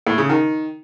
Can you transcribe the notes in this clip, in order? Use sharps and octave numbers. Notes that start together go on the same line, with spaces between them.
A2
C#3
D#3